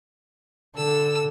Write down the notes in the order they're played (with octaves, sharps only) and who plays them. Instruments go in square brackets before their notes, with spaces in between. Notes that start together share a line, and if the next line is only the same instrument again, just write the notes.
[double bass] D3 [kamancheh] A4 [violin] E6